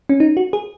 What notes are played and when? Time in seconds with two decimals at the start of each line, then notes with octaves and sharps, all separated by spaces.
0.09 C#4
0.20 D#4
0.37 F#4
0.53 G#4